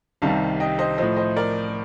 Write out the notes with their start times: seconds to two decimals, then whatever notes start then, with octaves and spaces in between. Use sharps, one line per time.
0.22 C2 C3 D#3 G3 F5 A5
0.60 D#5 G5
0.79 C5 D#5
0.98 A2 F3 C5 D#5
1.16 C5 D#5
1.36 A#4 D5